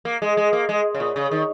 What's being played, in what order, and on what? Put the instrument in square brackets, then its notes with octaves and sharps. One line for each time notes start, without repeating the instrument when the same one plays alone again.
[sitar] A#3
G#3
G#3
A#3
G#3
C#3
A#2
C#3
D#3